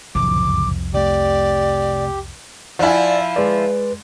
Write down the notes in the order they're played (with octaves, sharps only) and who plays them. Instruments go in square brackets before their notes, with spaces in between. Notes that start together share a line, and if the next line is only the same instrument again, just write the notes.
[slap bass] F#1 A2 D3 [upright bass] C2 F2 [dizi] D6
[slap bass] C3 A3 [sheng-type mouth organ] G4 [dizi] D5
[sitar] F3 E4 [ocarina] D5 [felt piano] F#5 G#5
[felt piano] G#3 D5 [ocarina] B4